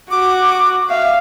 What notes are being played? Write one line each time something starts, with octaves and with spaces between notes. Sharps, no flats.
F#4 D6
E5 F5